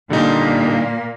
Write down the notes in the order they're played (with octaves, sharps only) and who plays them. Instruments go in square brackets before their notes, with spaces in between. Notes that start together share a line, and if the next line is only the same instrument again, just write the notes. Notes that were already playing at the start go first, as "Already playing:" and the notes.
[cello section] A#2 A#3 [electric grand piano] D3 G3 D#4